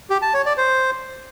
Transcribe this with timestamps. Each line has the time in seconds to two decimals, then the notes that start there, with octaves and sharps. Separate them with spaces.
0.10 G4
0.22 A5
0.34 C#5
0.46 D5
0.58 C5